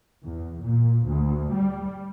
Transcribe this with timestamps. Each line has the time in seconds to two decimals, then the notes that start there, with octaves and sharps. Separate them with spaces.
0.23 E2
0.61 A#2
1.06 D2
1.52 G3